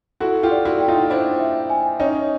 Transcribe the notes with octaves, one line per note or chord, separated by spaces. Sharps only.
E4 F#4 A4
F4 G4
D5
E4 F#4
G5
D#4 F4
D4 E4 C5
E5
G#5
C#4 D#4 D#5